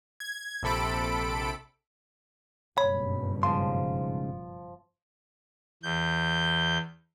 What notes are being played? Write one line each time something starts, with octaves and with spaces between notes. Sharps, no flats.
G#6
A#1 C3 A4 B5 D7
F#1 G2 B2 C#5 B5
G#2 C#3 F3 C6
E2 G6